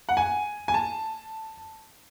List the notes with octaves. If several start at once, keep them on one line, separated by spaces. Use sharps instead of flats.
F#5
G#5
G#5
A5